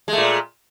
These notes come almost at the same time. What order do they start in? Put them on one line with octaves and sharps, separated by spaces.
G#3 A3 A#2